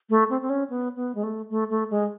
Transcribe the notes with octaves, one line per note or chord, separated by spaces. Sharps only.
A3
C4
C4
C#4
B3
B3
G#3
A3
A3
A3
G#3